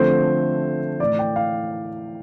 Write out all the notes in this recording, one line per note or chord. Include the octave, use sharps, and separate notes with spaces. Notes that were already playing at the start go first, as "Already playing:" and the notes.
Already playing: D3 F3 A3 C4 C5
A2 E3 A3 D5
G5
F5